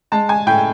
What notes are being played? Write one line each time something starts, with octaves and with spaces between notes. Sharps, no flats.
G#3 A5
G#5
A2 G5